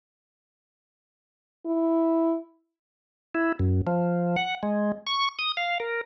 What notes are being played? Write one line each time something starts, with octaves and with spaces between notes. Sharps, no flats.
E4
E4
F#2
F3
F#5
G#3
C#6
D#6
F5
A#4